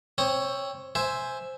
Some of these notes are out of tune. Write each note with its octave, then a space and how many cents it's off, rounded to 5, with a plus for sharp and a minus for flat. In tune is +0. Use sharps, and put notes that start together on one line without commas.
C4 +20 C#5 +0 D#6 +0
C5 +0 E5 +0 G#5 +0